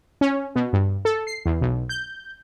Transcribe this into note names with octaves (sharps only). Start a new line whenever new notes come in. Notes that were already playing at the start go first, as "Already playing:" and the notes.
C#4
B2
G2
A4
C7
E2
B1
G6